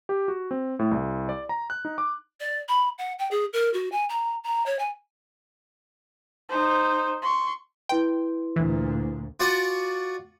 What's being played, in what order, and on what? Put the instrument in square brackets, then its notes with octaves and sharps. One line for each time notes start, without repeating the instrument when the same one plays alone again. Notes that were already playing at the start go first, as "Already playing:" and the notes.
[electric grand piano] G4
F#4
C4
A2
C2
D5
A#5
F#6
D#4
D6
[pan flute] D5
B5
F#5
G5
G#4
A#4
F#4
G#5
A#5
A#5
C#5
G#5
[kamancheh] D#4 C5
C6 C#6
[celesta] E4 B4 C6 [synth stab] G5
[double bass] D2 A#2 [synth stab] E3
[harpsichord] F4 F#4 D5 F#5 G#5 C#6